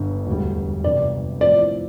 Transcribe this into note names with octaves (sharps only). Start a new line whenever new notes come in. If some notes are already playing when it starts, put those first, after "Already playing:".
Already playing: G1 G2 D3
E1 D2 D3 G3
G1 F2 C3 D5
A2 F3 C4 D5